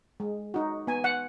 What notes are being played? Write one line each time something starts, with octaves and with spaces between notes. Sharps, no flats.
G#3
D#4 F#4
B3 G#5
F#5